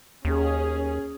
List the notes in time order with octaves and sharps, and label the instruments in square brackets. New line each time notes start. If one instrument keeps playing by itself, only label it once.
[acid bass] D#2 [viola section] C#4 G#4